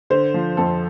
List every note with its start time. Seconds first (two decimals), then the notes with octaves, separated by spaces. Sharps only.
0.10 D3 C5
0.34 F3
0.57 F2 A4